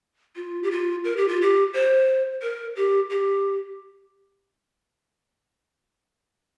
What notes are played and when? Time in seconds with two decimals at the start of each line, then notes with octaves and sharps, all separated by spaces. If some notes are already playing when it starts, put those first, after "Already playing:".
0.36 F4
0.63 G4
0.71 F4
1.04 A#4
1.17 G4
1.28 F4
1.41 G4
1.74 C5
2.42 A#4
2.76 G4
3.10 G4